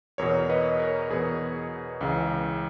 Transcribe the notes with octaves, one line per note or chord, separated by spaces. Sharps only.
E2 B2 A#4 C#5
B4 D#5
A#4 C#5
E2 B2 G#4 B4
C#2 C#3 E3